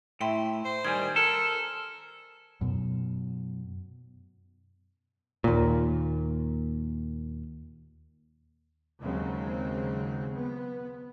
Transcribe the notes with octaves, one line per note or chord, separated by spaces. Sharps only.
A2 E4 E5 G5 C6
C5
D#3 G3 G#5 G#6
A4 A#4
F#2 B2
D#2 A#2
D#2 C#3 F#3 G#3 C4
B3